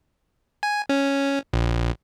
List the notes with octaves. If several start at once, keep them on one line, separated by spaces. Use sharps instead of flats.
G#5
C#4
A#1